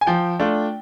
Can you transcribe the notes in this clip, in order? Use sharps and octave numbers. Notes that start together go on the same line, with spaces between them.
G#5
F3 G5
A3 D4 F4